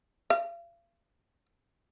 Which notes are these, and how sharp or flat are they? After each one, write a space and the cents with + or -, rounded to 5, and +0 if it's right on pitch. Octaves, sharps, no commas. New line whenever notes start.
F5 -40